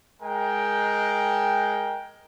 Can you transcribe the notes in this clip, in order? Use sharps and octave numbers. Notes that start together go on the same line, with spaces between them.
G#3 A#4 G5